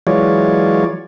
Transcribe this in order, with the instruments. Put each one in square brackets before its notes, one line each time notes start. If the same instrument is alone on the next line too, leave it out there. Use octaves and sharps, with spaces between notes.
[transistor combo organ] E3 F#3 G#3 F4 C#5 D5